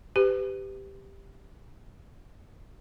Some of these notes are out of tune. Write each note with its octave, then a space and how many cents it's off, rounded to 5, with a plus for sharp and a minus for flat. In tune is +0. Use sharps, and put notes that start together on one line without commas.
G4 +0 B4 +30